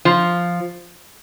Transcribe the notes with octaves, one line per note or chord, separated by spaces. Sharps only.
F3